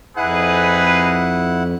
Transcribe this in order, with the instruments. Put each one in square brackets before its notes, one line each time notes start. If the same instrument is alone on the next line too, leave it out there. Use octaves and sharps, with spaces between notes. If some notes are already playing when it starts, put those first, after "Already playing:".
[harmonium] F2 [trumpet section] D#4 G#4 B4 [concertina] E4 F#5